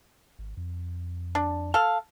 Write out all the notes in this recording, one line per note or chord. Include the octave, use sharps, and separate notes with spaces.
G#1
F2
D4
A4 F5